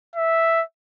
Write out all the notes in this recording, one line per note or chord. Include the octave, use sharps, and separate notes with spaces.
E5